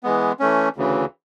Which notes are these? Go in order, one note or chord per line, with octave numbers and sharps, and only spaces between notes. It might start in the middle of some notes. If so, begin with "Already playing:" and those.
E3 G#3 B3
E3 A3 C#4
D2 C#3 E3